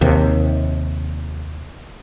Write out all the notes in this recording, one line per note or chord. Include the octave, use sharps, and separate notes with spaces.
D#2 C3